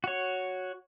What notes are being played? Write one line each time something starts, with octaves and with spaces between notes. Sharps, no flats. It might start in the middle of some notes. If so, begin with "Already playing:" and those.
F#4 C#5